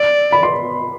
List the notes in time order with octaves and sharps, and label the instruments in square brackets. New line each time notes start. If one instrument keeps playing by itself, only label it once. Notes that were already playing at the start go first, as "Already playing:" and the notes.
Already playing: [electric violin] D5 [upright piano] E6
[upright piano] B5
C6